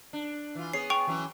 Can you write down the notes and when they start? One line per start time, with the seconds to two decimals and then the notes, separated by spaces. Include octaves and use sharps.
0.13 D4
0.55 E3 F4
0.73 B3 G#4 C#5 C7
0.90 G5 C#6 F7
1.07 E3 F#3 C#4